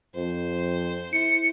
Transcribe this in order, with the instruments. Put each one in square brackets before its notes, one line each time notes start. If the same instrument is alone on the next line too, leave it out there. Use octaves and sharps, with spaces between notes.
[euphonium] F2 [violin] C5
[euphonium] E4 [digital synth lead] C#7